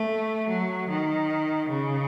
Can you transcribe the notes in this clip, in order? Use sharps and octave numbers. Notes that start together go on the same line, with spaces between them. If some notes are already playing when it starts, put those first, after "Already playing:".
Already playing: A3
F#3
D#3
C#3